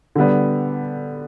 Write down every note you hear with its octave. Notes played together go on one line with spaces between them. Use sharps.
D3 G3 B3